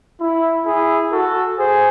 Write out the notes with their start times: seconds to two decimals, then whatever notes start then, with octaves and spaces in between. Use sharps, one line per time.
0.20 E4
0.66 E4 G#4
1.12 F#4 A4
1.58 G#4 C5